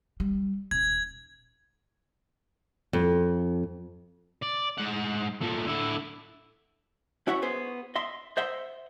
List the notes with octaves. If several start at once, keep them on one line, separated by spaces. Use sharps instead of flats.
G3
D#1 G#6
F2
D5
G#2 F#5
A#2 A3
D3 E4
C#4 E4 F#4 C#5 E5 F#5
B3 G#4 C5
D#5 E5 C6
C5 D#5 E5 F#5 C6